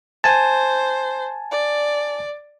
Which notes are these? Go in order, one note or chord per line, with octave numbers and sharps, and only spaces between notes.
C5 G#5 A5
D5